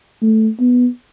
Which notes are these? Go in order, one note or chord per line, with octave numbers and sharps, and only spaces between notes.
A3
B3